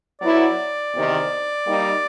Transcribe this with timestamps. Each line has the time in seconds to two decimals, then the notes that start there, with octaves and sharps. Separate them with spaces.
0.21 F#3 B3 E4 D5
0.93 E2 C3 D#3
1.66 G3 A#3 D#4